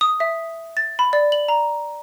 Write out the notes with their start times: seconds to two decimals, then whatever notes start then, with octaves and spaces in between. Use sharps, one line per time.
0.01 D#6
0.20 E5
0.77 A6
0.99 B5
1.13 D5
1.32 F#7
1.48 A#5